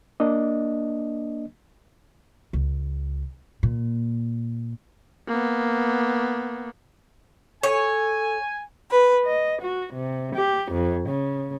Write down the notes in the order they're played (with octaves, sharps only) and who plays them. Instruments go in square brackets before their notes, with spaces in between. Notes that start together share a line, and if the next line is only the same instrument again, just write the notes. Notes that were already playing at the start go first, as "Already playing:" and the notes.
[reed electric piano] A#3 D4 D#5
[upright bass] C#2
A#2
[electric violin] A#3 B3
[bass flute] A4 [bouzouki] C#5 [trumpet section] G#5
[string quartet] B4
D#5
F#4
C3
G4
F2
C#3